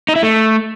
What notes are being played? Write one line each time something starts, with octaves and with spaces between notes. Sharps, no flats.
D#4
E4
A3